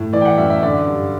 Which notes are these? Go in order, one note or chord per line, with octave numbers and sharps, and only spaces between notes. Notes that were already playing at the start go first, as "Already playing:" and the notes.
Already playing: A2
E3 D5
G5
F#5
F#2 E5
E5
D3 D5
G2